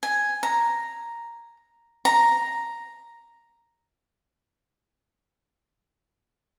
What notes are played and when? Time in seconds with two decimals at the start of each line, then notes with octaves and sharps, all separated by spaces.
0.03 G#5
0.43 A#5
2.05 A#5